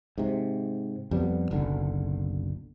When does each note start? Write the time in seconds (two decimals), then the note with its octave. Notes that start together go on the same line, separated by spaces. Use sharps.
0.18 G#2 C3
1.11 F2 G3 B3
1.51 F#1 B1 D3